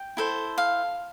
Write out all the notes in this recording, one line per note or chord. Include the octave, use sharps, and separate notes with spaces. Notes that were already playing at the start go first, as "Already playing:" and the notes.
Already playing: G5
E4 A4 C5
F5